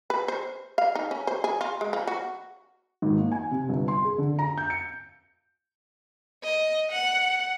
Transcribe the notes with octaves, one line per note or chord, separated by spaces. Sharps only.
B4
C5
F5
D#4
C#4
C5
G#4
F4
G#3
F3
F#4
G#1
A#3
G#5
C3
G1
C6
G#4
D3
A#5
G6
C#7
D#5
F#5